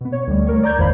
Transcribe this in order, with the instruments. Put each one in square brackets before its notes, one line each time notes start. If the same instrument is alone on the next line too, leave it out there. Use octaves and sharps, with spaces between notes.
[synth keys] B2 B3
C#5
D2 G3
A3 A#4 C#5
D5 A#5 G6 G#6
G#1 E2 D#3 C5 F5 B5